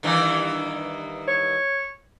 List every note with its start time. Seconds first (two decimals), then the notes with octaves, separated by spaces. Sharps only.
0.03 G2 D#3 E3
1.28 C#5